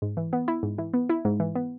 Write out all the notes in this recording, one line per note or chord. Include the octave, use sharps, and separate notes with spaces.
G#2
E3
B3
E4
G#2
E3
B3
E4
G#2
E3
B3